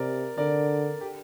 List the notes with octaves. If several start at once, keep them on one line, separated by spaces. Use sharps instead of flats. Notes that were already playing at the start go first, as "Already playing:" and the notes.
Already playing: C3 A#4 D5
D3 A#4 D5
G4